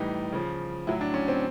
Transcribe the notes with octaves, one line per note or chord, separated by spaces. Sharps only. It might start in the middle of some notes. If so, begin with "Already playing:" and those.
Already playing: A2 E3 G3 D#4
C#3 F3
A2 F#3 E4
D4
C#4
C4